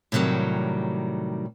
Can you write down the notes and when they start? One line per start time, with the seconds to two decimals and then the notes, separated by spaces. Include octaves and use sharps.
0.12 A2 C3 D#3 F#3 G3